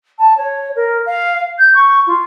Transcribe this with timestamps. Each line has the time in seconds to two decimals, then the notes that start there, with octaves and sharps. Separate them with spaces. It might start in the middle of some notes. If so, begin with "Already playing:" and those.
0.19 A5
0.37 C#5
0.76 A#4
1.06 F5
1.59 G6
1.75 C#6
2.07 F4